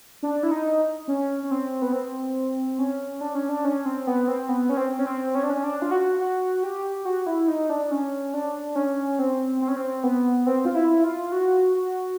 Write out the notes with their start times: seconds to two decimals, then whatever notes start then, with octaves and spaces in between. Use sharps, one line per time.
0.23 D4
0.43 E4
0.51 D#4
1.08 C#4
1.43 C#4
1.51 C4
1.82 B3
1.93 C4
2.79 C#4
3.21 D4
3.35 C#4
3.49 D4
3.64 C#4
3.86 C4
4.07 B3
4.28 C4
4.49 B3
4.69 C#4
4.77 C4
4.99 C#4
5.06 C4
5.35 C#4
5.43 D4
5.50 C#4
5.63 D4
5.82 F4
5.91 F#4
6.20 F#4
6.63 G4
7.05 F#4
7.27 E4
7.48 D#4
7.70 D4
7.91 C#4
8.34 D4
8.76 C#4
9.19 C4
9.61 C4
9.68 C#4
9.76 C4
10.04 B3
10.46 C4
10.65 F4
10.75 E4
11.04 F4
11.32 F#4
11.75 F#4